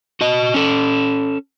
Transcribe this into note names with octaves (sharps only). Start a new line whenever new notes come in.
F#4 D#5
C#4 A4